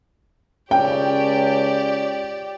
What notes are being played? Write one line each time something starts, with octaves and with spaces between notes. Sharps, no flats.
C#2 G4 C#5 D5 G5